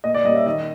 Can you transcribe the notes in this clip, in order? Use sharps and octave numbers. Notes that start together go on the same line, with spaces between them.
A#2 D#5
D5
G3 A#3 C#4 D#5
E5
D#3 D#5